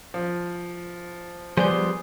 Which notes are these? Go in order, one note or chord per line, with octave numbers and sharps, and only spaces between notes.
F3
F3 G3 B3 G#4 C5 D5